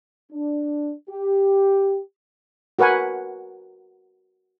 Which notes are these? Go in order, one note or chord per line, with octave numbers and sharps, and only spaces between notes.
D4
G4
F#4 A#4 B4 F#5 G#5